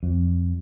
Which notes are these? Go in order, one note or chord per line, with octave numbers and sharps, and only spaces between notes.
F2